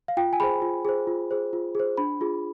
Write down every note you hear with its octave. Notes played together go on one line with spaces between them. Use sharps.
F5
F4 G5
G#5
G#4 C5 B5
F4
G#4 C5
F4
G#4 C5
F4
G#4 C5
D4 B5
F4 G#4